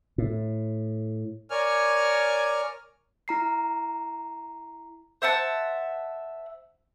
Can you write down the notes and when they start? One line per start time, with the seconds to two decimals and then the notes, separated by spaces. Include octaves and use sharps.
0.18 A2
1.50 A#4 C#5 D5 G#5 F6
3.28 E4 A#5 C7
5.22 C5 E5 F#5 A5